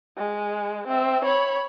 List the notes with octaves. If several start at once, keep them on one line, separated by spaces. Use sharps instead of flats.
G#3
C4 E5
C#5 B5